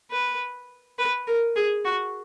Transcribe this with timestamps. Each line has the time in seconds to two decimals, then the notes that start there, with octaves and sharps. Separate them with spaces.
0.11 B4
0.99 B4
1.27 A#4
1.56 G#4
1.85 F#4